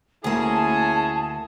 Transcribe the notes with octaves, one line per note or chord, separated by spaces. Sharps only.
D2 A#3 C#4 E4 G#4 A5